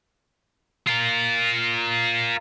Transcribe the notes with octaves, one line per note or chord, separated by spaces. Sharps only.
F4 A#4